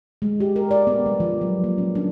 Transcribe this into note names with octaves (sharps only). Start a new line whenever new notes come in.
G#3
G4
A#4
D5
B3
G3
F3
F#3
A#3
C#4
D4